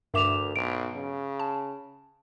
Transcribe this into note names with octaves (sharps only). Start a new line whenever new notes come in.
D2 G2 A#4 E5 D6 E7 F7
B1 D7
C#3
A5